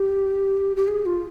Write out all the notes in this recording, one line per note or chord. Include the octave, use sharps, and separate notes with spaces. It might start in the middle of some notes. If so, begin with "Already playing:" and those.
Already playing: G4
G4
G#4
F4